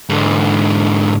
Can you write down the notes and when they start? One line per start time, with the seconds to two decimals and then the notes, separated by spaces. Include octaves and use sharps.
0.09 G#2 D3